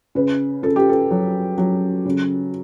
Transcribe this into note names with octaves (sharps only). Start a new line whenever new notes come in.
C#3 B4
C#3 A4
G4
A4
F#3
F#3
C#3